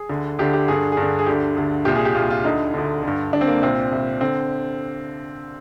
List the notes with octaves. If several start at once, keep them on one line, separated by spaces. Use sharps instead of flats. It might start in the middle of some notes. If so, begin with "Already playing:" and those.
Already playing: G#4
D2 D3
D2 D3 G4
G4
G2 D3 G#4
G2 G#4
D3
G#4
D2 D3 G4
D2 D3
C2 A#2 G4
G#4
G4
C2 A#2 F4
F4
D2 D3 D#4
D2 D3
G2 D3
G2 D3 D4
C4
A#3
C2 A#2 C4
C2 A#2
D3 C4